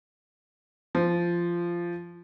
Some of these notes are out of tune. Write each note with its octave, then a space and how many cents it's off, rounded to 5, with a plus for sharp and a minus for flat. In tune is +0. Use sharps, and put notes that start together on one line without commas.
F3 -15